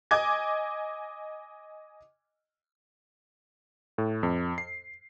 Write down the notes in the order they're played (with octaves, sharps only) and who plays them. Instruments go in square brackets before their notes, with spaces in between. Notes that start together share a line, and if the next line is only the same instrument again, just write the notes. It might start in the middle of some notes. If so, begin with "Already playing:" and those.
[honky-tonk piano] D#5 G#5 D6 G#6
[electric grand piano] A2
F2
C7